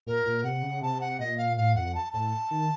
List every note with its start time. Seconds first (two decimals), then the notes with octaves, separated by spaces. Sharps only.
0.07 A#2 A#4
0.25 A#2
0.44 C3 F#5
0.63 C#3
0.82 C3 A5
1.01 F#5
1.19 A#2 D#5
1.38 F5
1.57 A2 F5
1.75 F2 F#5
1.95 A5
2.13 A2 A5
2.51 D#3